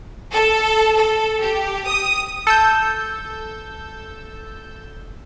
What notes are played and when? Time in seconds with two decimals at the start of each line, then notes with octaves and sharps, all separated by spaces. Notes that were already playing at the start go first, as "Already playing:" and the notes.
0.31 A4
0.96 A4
1.41 G4
1.86 D#6
2.47 A4 E6 G6